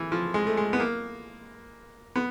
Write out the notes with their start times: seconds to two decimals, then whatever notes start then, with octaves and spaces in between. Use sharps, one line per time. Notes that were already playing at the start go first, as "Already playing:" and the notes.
Already playing: E3
0.12 F3
0.34 G#3
0.47 A3
0.57 G#3
0.73 B3
0.80 A#3
2.16 B3